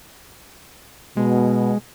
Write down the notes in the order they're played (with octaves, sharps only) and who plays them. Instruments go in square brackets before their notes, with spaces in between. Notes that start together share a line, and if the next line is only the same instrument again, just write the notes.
[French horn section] B2 [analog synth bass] G#3